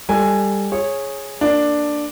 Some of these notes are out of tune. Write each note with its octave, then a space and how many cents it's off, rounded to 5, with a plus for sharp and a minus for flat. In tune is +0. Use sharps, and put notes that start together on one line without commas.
G3 +20 A4 +20 G#5 +0
G#4 +0 C#5 -15
A#3 -10 D4 +5